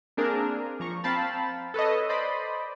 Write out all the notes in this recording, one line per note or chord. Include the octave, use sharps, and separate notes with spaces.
A#3 C4 D4 G#4 A#4
F3 A#5 C#6
C4 F5 G5 A5 B5 A6
A4 B4 C#5 D#5
C5 D5 D#5 B5